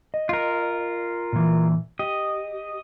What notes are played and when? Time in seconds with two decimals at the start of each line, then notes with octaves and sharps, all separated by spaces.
0.14 D#5
0.29 F4 A#4
1.33 A#2 E3
1.99 G4 D#5